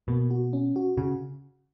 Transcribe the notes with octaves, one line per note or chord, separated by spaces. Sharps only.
B2 A#3
F#4
C#4
F#4
C#3 F#4